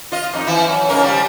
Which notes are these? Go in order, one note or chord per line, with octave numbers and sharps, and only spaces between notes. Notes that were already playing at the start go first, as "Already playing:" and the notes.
F4 D#5
F2 D#4
E3 E4
F#3
G#2 C#3 A#4
F3 G3